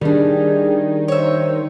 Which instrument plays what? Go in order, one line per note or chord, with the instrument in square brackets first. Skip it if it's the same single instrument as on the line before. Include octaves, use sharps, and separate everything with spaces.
[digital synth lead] D#3 [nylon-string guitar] G3 D4 [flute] G#4
[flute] C5 [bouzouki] C#5 E5